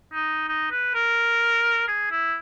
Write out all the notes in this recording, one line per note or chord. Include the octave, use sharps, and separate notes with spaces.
D#4
D#4
B4
A#4
G#4
E4